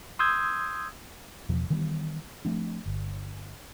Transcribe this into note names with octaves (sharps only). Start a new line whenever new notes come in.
C6 D#6 E6 G6 G#6
E2 B2 F3
D#3 E3 G3 B3
F3 A3 C4 D4
G1